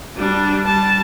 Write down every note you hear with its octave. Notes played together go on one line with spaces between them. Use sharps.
G3 D4
G3 A5